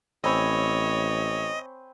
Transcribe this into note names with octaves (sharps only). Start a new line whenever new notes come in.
A1 C4 C#5 D#5 G#5 B5